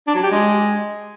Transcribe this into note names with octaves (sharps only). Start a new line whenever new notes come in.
D4
F#3
G4
G#3